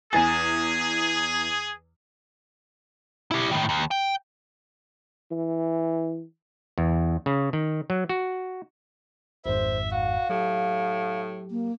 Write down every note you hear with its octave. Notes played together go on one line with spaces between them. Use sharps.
E2 E3 G#4 G#5 A6
E4 G4
A2 D#3
D#2
G5
E3
E2
C#3
D#3
F#3
F#4
G#1 F2 G#2 C5 E5
F#4 F5
A2 F#3 G4
A#3